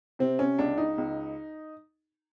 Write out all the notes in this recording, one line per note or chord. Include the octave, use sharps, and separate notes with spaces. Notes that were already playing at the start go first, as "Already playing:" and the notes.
C3 C4
C#4
C#2 D4
D#4
C#2